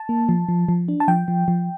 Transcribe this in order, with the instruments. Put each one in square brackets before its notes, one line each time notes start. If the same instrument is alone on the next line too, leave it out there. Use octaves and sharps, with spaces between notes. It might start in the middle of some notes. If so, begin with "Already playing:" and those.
Already playing: [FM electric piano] A5
A#3
F3
F3
F3
D4
A5
F3 G5
F3
F3